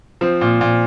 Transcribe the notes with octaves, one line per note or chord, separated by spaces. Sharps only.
F3 C4
A#2
A#2